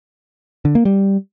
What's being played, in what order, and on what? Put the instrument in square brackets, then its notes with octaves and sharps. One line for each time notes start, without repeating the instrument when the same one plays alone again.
[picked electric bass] D3
A#3
G3